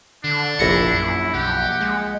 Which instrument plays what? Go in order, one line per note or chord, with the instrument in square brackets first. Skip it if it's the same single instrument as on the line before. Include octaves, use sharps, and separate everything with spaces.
[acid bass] D3 [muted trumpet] D4
[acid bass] F1 [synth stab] A#1 A#6 C#7 [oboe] E4
[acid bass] F#2
[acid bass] B1 [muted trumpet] G4 [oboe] F#5
[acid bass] G#3